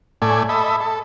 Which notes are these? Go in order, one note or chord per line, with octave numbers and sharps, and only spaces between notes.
A2 A3 D5 G#5
A4 D#5 E5 B5
A4